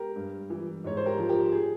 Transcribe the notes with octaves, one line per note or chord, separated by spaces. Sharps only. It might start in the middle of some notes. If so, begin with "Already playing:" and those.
Already playing: G4 A#4
G2
E3
G#2 C#5
C5
G4 A#4
F3
G4 A#4
G#4